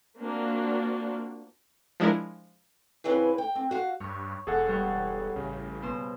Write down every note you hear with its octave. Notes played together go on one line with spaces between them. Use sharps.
A#3 C4 D4 F4 F#4
F3 G#3 D4 E4 A#4
C#3 E3 C4 G#4 B4
G5
C4
F#4 F5
G2 C#5
E1 G#4 A4 F#5
G2 G3 C#5
A1 C#3
B2 C5